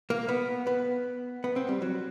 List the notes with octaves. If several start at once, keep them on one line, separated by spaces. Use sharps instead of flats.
A#3
B3
B3
B3
C4
G3
F#3